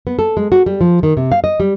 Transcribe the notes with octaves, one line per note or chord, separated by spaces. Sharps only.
B3
A4
G#3
F#4
G3
F3
D#3
C3
F5
D#5
G3